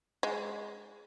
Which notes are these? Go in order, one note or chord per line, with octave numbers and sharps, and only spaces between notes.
G#3